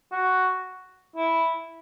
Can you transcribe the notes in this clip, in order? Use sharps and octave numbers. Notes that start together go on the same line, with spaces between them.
F#4
E4